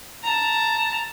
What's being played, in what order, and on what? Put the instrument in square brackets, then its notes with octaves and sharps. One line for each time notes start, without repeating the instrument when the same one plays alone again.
[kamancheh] A5 A#5